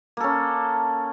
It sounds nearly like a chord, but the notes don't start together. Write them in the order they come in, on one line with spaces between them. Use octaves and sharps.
A#3 A4 C#4